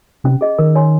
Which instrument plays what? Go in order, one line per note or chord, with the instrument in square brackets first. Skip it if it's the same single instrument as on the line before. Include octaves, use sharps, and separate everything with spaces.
[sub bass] C3 [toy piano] C#4
[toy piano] G#4 D#5
[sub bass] D#3 [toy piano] A#4
[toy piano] C#5 G#5 C6